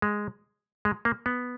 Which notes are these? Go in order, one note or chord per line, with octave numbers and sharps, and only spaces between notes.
G#3
G#3
A#3
B3